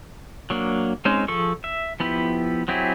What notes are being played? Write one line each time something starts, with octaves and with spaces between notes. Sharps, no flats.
F#3 A#3 D4
G#3 C4 C#4 D#4
F3 G#4 A4 C#6
E5
F3 B3 E4 G4
F#3 C4 E4 G4 G#4